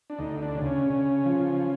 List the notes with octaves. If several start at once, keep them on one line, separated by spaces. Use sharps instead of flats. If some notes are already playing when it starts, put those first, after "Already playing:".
D4
D2 D#4
D4
C#3
C#4
C#3
F3